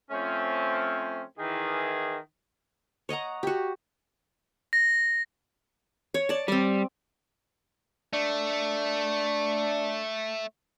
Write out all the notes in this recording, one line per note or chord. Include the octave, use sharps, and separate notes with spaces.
F3 A3 C4 C#4
D#3 E3 G#4
C#5 D#5 F#5 A#5
F#4 G4
A#6
C#5
D5 A5
G3 C4 D5
A3 D4